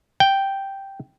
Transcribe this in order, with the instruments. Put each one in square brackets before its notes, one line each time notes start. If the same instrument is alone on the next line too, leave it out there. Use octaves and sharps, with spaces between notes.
[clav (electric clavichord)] G5